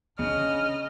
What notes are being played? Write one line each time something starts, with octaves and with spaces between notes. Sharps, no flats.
C#3 D4 D#5 F6